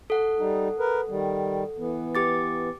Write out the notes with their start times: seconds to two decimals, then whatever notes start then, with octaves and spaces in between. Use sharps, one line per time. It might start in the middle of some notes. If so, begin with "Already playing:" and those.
0.10 A4 F#5
0.39 G3 D#4
0.79 A#4 B4
1.09 D#3 G3
1.79 E3 B3
2.15 G4 D6 A6